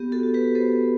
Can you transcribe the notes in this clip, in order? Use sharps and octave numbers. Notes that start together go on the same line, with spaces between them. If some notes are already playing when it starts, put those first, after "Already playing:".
Already playing: B3 G4
F#4 A4
F#4
G4 B4
B3 A4 C5